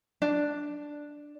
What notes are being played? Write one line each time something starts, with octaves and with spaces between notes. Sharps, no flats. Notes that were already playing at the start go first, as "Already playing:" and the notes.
D4